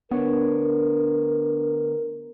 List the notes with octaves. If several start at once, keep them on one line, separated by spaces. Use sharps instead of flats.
D2 B3 D4 A#4 C#5